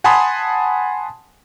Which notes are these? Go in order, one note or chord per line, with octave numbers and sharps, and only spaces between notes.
F#5 G#5 A5 B5 C6 D#6